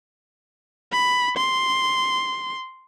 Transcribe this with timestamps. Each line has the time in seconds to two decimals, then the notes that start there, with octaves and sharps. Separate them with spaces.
0.92 B5
1.37 C6